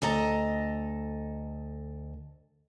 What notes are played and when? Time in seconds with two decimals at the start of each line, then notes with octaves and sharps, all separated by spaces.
0.02 D2 A4 D#5 A#5